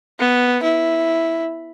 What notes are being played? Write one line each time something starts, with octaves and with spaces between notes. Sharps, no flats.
B3
E4